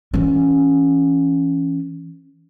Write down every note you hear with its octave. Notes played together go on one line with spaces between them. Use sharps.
E3 C#4